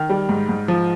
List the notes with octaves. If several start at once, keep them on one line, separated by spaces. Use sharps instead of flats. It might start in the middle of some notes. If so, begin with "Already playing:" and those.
Already playing: D#3 F6
G3
G#2
G#2
F3